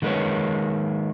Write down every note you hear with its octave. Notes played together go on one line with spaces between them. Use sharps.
D#3 G#3 A#3 C4 B4 C#5